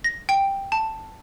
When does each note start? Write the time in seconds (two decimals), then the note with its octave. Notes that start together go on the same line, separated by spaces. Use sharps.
0.04 A#6
0.29 G5
0.72 A5